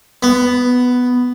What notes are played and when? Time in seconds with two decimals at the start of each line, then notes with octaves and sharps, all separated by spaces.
0.23 B3